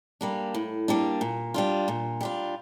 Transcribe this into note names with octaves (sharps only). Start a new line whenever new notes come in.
G3 A#3 D4
A2
G3 A#3 D4
A#2
G3 D4 F4
A#2
G3 D4 F4